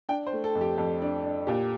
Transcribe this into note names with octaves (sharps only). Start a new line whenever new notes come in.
D4 G5
C5
A3
A4
F2
G4
F2
D4
D4
A#2 G4